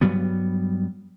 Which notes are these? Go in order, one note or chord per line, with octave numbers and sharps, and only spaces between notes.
G2 F#3 G3 B3